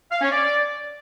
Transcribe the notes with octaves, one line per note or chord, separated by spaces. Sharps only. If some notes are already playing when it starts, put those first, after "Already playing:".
F5
C#4
D5